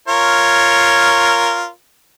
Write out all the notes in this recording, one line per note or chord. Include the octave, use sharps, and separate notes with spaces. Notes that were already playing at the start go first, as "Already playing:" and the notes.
F4 A#4 C#5